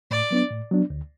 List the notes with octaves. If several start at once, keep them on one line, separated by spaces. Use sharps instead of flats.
A2 D5
F#3 B3 D4
A2
F#3 B3 D4
D2